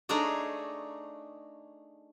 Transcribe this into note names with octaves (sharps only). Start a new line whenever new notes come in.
A3 D4 D#4 G#4 C#5 A#5